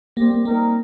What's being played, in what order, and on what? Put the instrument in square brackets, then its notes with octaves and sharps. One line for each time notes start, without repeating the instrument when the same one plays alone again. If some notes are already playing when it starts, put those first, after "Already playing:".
[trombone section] G3 C4 G4 [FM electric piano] A#3
[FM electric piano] A#3
[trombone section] G3 C4 D#4 A#4 [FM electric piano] A#3